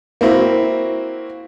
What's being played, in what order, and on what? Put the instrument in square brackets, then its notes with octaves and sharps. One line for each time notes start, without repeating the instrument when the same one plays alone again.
[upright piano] A#3 C4 E4 F#4